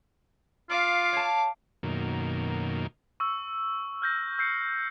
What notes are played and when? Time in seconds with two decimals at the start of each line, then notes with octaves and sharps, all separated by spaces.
0.70 F4 F5 D6
1.13 C#5 A5
1.83 F#2 B2 D#3 A#3
3.20 C#6 E6
4.02 F6 G6 A#6
4.38 E6 G6 C7 C#7